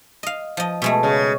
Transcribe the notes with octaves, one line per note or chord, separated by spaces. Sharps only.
D#5 F5
F3 D#5
B2 G#3 A3
C#3